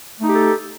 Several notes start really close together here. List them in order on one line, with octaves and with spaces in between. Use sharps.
A3 D#4 G4 A4